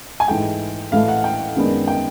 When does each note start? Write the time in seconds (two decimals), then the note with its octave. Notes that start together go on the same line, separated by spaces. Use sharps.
0.20 G#5
0.28 G#2 E3 A3 G5
0.92 A2 E3 A3 F5
1.08 F#5
1.24 G5
1.56 F#2 D#3 G#3 B3 D4
1.88 G5